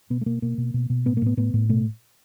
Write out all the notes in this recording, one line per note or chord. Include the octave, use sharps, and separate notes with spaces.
B2 B3
A3
B2 A#3
B2 A#3
B2
B2
B2
A2 B3
A#3
A2 B3
A2 B3
A2
B2 A3